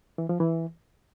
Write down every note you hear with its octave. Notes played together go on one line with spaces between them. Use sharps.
E3
F3
E3